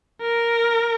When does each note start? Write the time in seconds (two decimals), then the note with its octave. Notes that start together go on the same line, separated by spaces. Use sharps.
0.21 A#4